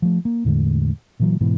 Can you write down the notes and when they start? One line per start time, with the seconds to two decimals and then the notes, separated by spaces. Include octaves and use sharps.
0.02 F3 A3
0.25 A#3
0.45 E2 A2 D3 G#3
1.20 A#2 E3 F#3
1.41 G#2 B2 E3